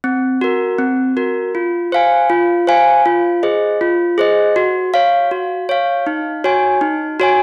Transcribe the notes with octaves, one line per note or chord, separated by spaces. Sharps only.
C4
F#4 A#4
C4
F#4 A#4
F4
C5 F5 G#5
F4
C5 F5 G#5
F4
G#4 C5 D#5
F4
G#4 C5 D#5
F#4
C#5 F5
F#4
C#5 F5
D#4
F#4 C#5 G#5
D#4
F#4 C#5 G#5